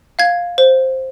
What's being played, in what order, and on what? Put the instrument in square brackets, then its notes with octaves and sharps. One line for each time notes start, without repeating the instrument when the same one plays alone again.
[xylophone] F5 G#6
C5